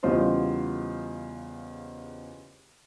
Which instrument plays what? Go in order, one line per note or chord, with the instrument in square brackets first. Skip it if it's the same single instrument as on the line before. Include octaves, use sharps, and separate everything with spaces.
[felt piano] E2 C#3 G3 F4 C5 D#5